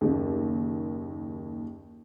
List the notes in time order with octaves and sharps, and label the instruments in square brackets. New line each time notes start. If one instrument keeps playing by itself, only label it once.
[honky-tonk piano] F#1 D#2